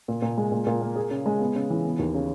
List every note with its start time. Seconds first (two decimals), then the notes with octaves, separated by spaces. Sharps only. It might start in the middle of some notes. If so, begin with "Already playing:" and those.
0.08 A#2
0.22 A#2
0.37 G#3
0.52 A#2
0.67 A#2
0.82 A#3
0.96 G#4
1.11 C#3
1.26 G#3
1.40 B3
1.56 C#3
1.70 E3
1.84 B3
1.99 D#2
2.14 C#3